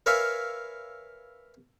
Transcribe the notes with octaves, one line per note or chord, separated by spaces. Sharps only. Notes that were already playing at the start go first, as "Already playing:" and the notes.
A#4 B4 C#5 E5 F5 G#5